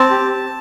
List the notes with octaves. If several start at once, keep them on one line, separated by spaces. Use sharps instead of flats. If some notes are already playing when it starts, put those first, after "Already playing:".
Already playing: C4 A5
G4